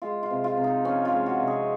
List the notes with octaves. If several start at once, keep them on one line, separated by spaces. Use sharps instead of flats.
G#3 F4
F4
C3
F4
C3
D#4
F3 C#4
F4
G#3
F#4
C3
G#4